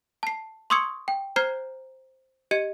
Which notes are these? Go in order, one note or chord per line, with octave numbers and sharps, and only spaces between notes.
A5 C7
C6 C#6 D#6 E6 G#6 C#7
G5
C5 A#5 F6 G6 G#6 C7
G4 D#5 G#6 C#7